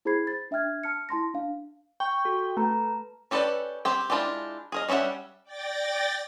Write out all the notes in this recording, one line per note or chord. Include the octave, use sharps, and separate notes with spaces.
E4 G#4 C5 B5 G#6 C7
A6
D4 E5 G5 F6 G#6
A5 F6 C#7
E4 A5 C6 A#6
D4 F5
G5 C#6
F#4 A4
A3 B4 A#5
C#4 G4 A4 B4 D5
C4 G4 G5
G#3 D4 E4 F4 G4
G#4 A#4 D#5
G3 C#4 G4 E5 F#5
D5 G5 A6 A#6